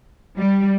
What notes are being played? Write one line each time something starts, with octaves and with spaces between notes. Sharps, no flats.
G3